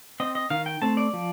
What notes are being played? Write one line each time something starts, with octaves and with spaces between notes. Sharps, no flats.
C4 D#5
D#5
D#3 F5
G5
A3 C4 A5
D5
F3